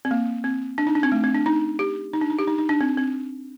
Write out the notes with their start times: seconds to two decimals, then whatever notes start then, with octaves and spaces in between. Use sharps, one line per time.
0.05 C4
0.11 A#3
0.44 C4
0.78 D4
0.87 D#4
0.95 D4
1.03 C4
1.12 A3
1.24 C4
1.35 D4
1.46 D#4
1.79 G4
2.13 D#4
2.21 D4
2.30 D#4
2.39 G4
2.47 D#4
2.58 D#4
2.69 D4
2.81 C4
2.98 C4